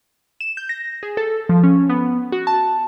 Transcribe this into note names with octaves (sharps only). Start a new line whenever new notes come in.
E7
G6
A#6
G#4
A4
F3
C#4
B3
F#4
A5